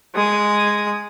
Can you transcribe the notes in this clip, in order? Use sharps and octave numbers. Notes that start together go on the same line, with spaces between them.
G#3 D#6